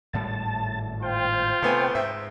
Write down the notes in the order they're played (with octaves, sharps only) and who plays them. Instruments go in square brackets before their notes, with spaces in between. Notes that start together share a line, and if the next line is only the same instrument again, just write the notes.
[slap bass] G#1 A2 G3 [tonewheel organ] A5
[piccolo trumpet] F4 [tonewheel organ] C5 G5
[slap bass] C3 [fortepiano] A3 B3 G#5
[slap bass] G#2 [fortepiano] E5